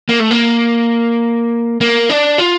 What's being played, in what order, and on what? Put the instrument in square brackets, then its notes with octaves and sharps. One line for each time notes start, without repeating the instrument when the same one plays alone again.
[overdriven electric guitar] A#3
A3
A#3
A#3
D4
F4